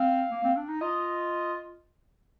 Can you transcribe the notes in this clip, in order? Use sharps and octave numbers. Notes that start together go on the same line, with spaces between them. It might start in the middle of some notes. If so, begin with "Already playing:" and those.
Already playing: C4 F5
A#3
C4
D4
D#4
F4 D#5